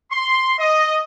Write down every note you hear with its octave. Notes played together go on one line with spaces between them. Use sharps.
C6
D#5